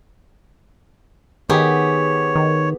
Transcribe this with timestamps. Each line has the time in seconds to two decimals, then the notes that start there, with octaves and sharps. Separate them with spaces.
1.49 D#3 B3 G4 G#4 C#5
2.35 D#3